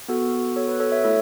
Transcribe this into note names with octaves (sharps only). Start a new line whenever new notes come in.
B3 F#4 A4
A4 C#5
B4
A4 C#5
C#5 E5
A3 E4 A4